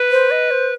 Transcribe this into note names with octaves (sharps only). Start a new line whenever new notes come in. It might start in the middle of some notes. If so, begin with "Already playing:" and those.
Already playing: B4
C5
D#5
C5